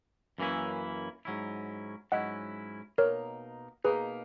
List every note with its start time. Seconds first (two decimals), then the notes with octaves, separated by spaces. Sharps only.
0.38 F#2 E3 A#3 C#4 E4
1.25 G#2 F#3 C#4 E4
2.12 G#2 F#3 C#4 E4 D#5 F#5
2.98 B2 A#3 D#4 A#4 C#5
3.85 B2 A#3 D#4 G#4 B4